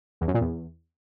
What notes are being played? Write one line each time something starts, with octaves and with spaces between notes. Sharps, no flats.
E2
F#2
A#2
E2